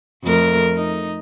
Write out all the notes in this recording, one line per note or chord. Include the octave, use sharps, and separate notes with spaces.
F2 A3 A#4
D#4